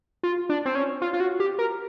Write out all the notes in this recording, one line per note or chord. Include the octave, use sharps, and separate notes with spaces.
F4
D4
C4
C#4
F4
F4
F#4
G4
A#4